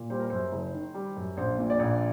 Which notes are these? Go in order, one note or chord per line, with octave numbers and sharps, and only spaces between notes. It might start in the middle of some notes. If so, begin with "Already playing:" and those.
Already playing: A#2
G3 C5
A#4
F#2 C5
F#1
D#3
G3
F#2
A#1 C5
A#2
D5
A#1